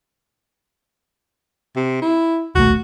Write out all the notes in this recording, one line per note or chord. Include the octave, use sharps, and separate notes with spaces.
C3
E4
D#1 B1 A3 F#4